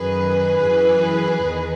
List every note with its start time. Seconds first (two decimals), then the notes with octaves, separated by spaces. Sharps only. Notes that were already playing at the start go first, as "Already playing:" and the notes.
Already playing: F#2 D#3 G#4 B4
0.66 F#2 E3
1.42 E2 D#3